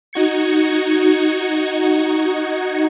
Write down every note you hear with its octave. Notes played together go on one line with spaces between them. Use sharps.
D#4 F#4 G#6 C#7